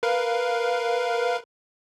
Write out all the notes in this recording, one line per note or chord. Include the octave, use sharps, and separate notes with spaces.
A#4 B4 F5